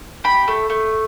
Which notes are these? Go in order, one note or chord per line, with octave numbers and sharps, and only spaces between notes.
G4 B5
A3
A3